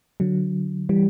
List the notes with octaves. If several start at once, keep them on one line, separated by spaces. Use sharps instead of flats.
D3 F#3
E3 G3